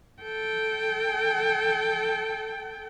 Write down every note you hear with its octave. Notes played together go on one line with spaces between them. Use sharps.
A4 G5